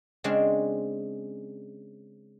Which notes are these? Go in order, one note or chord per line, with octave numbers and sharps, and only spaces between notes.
C#3 G#3 C4 D4